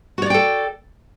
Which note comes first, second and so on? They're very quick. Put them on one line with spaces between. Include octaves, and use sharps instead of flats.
F#4 C#5 D5 G5 A4